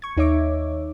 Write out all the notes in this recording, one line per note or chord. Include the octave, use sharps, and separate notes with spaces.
C#6 G#6
D#2 D#4 C#5 E5 D6